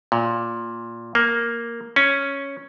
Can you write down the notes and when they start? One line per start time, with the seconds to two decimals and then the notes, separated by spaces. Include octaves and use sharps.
0.12 A#2
1.15 A#3
1.96 C#4